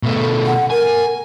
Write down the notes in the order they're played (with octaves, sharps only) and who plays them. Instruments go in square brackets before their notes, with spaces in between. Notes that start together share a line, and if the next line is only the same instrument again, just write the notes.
[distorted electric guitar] B2 A3
[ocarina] F#5
[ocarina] A#4 [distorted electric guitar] G#5